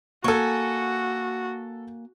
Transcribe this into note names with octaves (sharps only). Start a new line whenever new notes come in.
A#3 F#4 A4 G#5 C#6